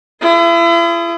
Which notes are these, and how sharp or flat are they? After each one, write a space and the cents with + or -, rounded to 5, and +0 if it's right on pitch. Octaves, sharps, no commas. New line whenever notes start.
E4 +40 G#4 +25